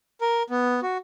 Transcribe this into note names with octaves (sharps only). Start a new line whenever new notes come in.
A#4
B3
F#4